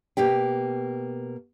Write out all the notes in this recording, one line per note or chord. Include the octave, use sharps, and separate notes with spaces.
B2 A#3 G4 G5